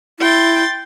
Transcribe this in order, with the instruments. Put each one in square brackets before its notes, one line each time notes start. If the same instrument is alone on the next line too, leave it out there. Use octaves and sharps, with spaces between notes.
[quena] E4 [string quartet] G5 C6 A6